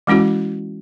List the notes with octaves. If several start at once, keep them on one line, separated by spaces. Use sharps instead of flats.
E3 G#3 C#4 E4 F#4